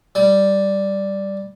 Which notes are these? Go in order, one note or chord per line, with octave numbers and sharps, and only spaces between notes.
G3